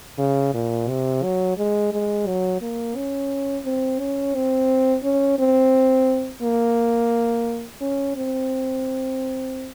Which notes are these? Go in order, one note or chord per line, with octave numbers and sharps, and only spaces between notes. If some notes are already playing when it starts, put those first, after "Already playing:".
C#3
A#2
C3
F#3
G#3
G#3
F#3
A#3
C#4
C4
C#4
C4
C#4
C4
A#3
C#4
C4